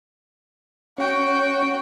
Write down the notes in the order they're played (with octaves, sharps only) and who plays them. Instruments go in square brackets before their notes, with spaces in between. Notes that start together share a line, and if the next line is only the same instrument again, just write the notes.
[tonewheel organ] C#4 C#5 [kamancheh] F#4 G5